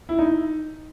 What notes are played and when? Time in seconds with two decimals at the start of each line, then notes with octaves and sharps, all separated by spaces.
0.09 E4
0.19 D#4